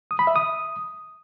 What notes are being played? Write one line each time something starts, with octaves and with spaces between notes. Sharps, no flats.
D#6
B5
E5
D#6